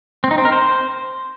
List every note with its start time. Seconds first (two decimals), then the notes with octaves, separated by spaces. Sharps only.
0.24 C4
0.31 D#4
0.38 C4
0.45 A#4
0.52 C5